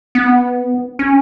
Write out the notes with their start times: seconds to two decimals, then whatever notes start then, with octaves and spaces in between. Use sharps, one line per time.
0.15 B3
0.99 C#4